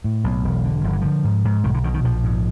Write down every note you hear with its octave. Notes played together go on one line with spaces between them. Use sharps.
A2
B1
E1
D3
G1 F3
E3
D3 F3
G#2
G#2
B1 D#3
D3
B2 D#3
D#3
A#1 F3
G#2